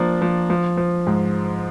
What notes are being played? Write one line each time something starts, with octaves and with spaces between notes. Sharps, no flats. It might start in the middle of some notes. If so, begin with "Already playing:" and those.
Already playing: F3 A#3 D4
F3
F3
F3
G#2